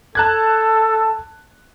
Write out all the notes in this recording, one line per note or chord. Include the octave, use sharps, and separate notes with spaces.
A4 A5 F#6 G#6